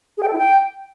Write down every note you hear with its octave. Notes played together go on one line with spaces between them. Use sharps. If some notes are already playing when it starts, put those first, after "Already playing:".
G#4
G5
A4
E4
G5